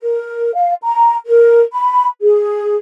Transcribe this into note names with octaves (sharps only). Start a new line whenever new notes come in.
A#4
F5
A#5
A#4
B5
G#4